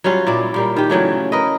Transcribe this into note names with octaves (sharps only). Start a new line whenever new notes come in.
F#3 G3 C#4 F4
A#2 E4 D5
A#2 G3 A#3
D#3 G4
C#3 E3 F#3 A3
A#4 B4 D#5